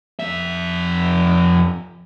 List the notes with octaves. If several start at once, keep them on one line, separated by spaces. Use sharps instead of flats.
F2 E5